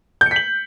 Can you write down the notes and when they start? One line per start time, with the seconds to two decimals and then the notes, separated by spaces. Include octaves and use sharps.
0.21 G6
0.26 C#7
0.31 B6
0.36 F#7